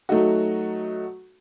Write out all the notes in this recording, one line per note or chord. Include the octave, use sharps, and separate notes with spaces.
F#3 A3 D#4 F#4